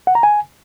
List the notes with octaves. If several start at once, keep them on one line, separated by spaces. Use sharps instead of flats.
F#5
A#5
G#5